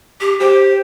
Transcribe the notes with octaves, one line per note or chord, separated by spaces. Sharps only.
G4
G4 C5